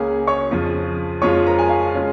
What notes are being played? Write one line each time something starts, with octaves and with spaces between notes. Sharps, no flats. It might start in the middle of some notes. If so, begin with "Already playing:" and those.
Already playing: C#2 C#3 A#3 C#4 G#4 G#5
C#5 C#6
F2 C#3 F3
F2 F3 G#3 F4 C#5 C#6
A#4 A#5
G#5
F5
C#3 G#3 C#4 F4